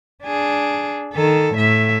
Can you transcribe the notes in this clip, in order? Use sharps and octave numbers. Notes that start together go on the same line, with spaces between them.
D4 G#4
D#3 A4
A2 E5